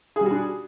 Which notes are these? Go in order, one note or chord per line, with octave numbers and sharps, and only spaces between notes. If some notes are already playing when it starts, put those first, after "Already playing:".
G3 D4 F#4 G#4